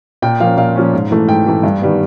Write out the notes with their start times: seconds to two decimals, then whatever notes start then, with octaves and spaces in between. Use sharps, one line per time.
0.22 A#2 G5
0.40 F3 A#3 C#4 F5
0.57 A#2 F5
0.76 F3 A#3 C#4
0.94 G#2
1.11 E3 A3
1.28 G#2 G5
1.46 E3 A3
1.63 G2
1.81 D#3 G3 B3